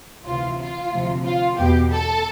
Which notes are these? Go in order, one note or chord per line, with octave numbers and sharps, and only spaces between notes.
D2 C3 E3 F4
F4
D2 C3 F3
F4
E2 B2 G4
A4